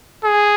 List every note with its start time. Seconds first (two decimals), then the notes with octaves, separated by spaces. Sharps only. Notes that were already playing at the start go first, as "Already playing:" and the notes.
0.24 G#4